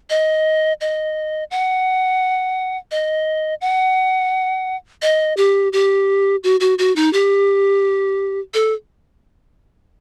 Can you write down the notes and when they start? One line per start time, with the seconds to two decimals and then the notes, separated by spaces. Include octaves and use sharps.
0.10 D#5
0.81 D#5
1.51 F#5
2.91 D#5
3.61 F#5
5.02 D#5
5.37 G4
5.73 G4
6.44 F#4
6.60 F#4
6.79 F#4
6.96 D#4
7.13 G4
8.54 A4